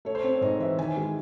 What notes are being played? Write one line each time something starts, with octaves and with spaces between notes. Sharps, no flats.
A3 C#5
C5
C4 C#5
G#2 D#5
E3 E5
D#3 G#5
G#3